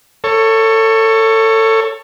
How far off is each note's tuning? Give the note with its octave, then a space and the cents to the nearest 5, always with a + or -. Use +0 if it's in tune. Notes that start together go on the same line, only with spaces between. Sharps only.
A4 +25 C#5 +0